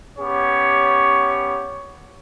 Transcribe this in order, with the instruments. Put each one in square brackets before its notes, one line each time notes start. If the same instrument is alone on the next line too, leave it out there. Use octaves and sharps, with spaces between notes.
[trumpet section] B3 C#4 G4 C#5